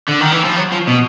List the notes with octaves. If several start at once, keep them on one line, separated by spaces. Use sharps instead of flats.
D3
D#3
E3
F3
F#3
F3
B2